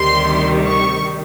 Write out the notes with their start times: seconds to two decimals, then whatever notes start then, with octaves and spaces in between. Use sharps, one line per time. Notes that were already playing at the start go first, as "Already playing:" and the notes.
Already playing: D2 C3 D#3 G3 C6
0.67 C#6